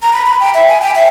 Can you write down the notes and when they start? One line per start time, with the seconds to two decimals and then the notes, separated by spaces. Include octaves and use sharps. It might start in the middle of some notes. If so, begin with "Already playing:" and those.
0.02 A#5
0.13 B5
0.26 B5
0.40 G5
0.54 E5
0.68 G#5
0.82 G5
0.95 E5